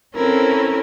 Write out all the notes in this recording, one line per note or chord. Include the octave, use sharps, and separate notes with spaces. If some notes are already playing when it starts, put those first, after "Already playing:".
C4 C#4 E4 A4 A#4